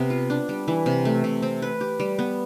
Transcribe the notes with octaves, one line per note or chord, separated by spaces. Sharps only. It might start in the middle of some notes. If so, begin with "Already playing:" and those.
Already playing: C3 B3
F4
D4
G3
E3
C3
A3
C3
C4
B4
G4
G3
B3